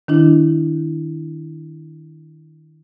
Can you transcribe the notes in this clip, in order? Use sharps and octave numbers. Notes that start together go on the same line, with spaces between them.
D#3 D4 E4